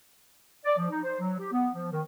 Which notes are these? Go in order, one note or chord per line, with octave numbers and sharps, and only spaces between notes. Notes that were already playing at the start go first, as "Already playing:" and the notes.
D5
F3
D#4
C5
F#3
G4
B3
F3
D#3